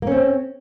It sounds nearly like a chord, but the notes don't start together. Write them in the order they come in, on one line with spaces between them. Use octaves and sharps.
A#3 C#4 C4